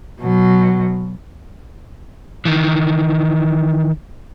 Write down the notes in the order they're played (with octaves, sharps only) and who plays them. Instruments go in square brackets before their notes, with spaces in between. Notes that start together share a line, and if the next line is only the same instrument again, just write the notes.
[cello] B2 F#3
[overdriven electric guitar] D#3 E3